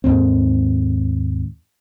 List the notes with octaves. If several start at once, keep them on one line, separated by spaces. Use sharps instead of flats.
D#2 G#2 C4